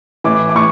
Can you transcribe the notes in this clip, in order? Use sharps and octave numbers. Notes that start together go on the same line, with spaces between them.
A2 E3 D6
D6
A2 C#6